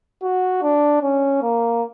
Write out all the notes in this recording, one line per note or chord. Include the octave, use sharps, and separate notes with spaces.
F#4
D4
C#4
A#3